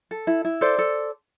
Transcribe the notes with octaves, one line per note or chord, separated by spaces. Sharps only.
A4
E4
E4
A4 C5 D5
A4